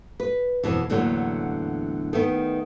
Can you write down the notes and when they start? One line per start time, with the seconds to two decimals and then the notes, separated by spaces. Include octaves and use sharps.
0.20 B4
0.63 F2 B2 E3
0.90 E2 A2 D3 F#3 A#3
2.13 D#3 A3 B3